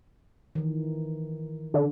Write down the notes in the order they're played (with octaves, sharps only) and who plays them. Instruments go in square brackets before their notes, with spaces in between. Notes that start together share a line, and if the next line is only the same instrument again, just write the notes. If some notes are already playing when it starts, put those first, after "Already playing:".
[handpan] D#3 E3
[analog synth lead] D3